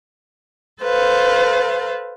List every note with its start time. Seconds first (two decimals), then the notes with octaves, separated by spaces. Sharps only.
0.82 A4 B4 C5 F5